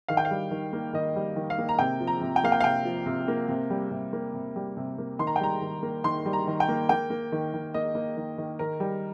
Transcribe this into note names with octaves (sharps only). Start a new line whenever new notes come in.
D#3 F5
G5
F5
G3
D#3
A#3
D#3 D#5
G3
D#3
F5
A#3
A#5
C3 G5
F3
A#5
C3
G5
A#3 F5
G5
F5
C3 G5
F3
C3
A#3
C3
G3
C3
A#3
C3
G3
C3
A#3
D#3 C6
A#5
G5
G3 A#5
D#3
A#3
D#3 C6
G3
A#5
D#3
G5
A#3
A#3 G5
A#3
D#3
D#3
A#3 D#5
A#3
D#3
D#3
D#3 A#4
G3